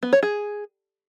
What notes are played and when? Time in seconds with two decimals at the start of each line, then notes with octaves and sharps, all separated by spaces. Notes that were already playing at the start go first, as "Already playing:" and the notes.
0.03 B3
0.13 C#5
0.23 G#4